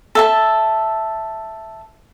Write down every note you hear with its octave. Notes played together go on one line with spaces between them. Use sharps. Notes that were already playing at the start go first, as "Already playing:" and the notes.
A4 E5 A5